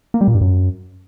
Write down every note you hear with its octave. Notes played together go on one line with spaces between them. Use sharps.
A#3
G3
A#2
G2
F#2